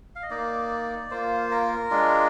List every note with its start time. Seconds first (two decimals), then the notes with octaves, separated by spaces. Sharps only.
0.16 F5
0.23 D#5
0.30 A#3 D#4 D5
1.11 A#3 F4 C5
1.51 A#4
1.91 G#3 D4 F4